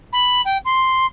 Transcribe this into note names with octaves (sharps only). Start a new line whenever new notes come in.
B5
G5
C6